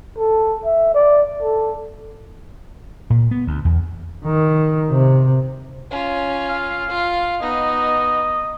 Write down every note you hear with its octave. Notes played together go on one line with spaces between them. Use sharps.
A4
E5
D5
A4
A#2
B3
D2
E2
D#3
C3
C#4 F4
F5
F4
B3 D#4 D#5